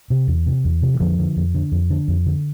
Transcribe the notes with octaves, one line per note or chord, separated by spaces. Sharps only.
C3
E2
C3
E2
C3
E3
F2 D3 F3
D3
F2
D3
F2
D3
F2
D3